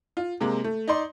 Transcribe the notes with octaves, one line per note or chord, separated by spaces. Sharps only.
F4
C3 G#3 A#3
A3
D#4 D5 C6